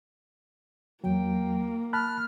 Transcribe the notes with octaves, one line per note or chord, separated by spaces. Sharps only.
E2 F#3 A#3 G5
A5 B5 F6 F#6